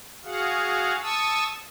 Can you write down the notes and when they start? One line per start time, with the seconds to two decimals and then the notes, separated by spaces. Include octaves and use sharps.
0.25 F#4 G#4 F5 F#5
1.01 A5 C#6 D#6 E6